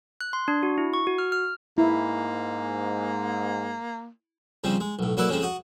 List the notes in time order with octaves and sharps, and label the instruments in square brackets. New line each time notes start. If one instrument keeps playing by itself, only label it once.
[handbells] F#6
C6
D4
F#4
E4
C#6
F#4
F6
F6
[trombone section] G#2 [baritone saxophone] A#3 [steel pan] E4
[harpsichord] F2 C#3 G3 C4
G#3
B1 A2
F#3 A#3 E4 A4 B4 D5
F2 C#3 F3 G#3 C4
F#4 D#6